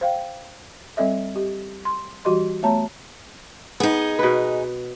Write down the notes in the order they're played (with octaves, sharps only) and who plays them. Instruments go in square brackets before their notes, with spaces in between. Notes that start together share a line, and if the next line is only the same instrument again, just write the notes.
[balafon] C5 F5 G5
G3 C4 A4 D#5 E5
G4 D#5
C6
E3 G3 F#4 G4 D#5 C6
A3 B3 C#5 A5 A#5
[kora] B3 [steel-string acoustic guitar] D#4 G#4
[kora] B2 B4